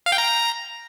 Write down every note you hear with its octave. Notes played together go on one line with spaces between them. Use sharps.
F5
G5
A#5